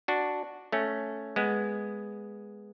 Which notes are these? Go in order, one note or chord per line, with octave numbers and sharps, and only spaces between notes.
D4 F#4
A3 C#4
G#3 B3